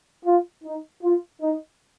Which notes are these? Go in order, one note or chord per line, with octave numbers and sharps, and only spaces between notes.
F4
D#4
F4
D#4